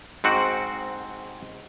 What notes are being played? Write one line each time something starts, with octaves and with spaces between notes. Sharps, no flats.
G#2 C4 F#4 F#5